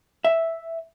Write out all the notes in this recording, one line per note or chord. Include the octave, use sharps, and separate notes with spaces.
E5